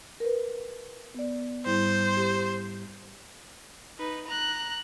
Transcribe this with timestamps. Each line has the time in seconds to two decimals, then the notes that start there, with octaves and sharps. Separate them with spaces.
0.20 A#4 B4
1.15 B3 D5
1.66 G#2 G3 E4 C5
2.17 G4
3.99 D#4 B4
4.27 A#5 F#6